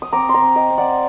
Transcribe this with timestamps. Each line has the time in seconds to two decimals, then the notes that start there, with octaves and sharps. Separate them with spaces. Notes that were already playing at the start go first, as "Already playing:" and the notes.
0.02 D#6
0.12 C4 A#5 D6
0.29 C6
0.34 A#5 D6
0.42 C4
0.56 D#5 G5
0.70 C4
0.78 D5 F#5